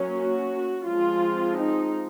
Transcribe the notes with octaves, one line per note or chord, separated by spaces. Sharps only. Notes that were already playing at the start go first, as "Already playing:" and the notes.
Already playing: F#3 A#3 C#4
F#4
F3 G#3 C4 F4
D#4